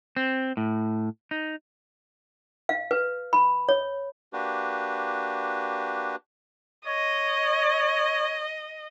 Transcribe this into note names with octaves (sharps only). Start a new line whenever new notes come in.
C4
A2
D#4
F5
B4
B5
C#5
A#3 D4 F#4 G4 B4
C#5 D#5